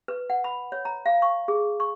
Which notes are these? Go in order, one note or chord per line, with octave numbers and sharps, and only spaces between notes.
B4
F#5
B5
C#5
A#5
F5
C#6
G#4
C#6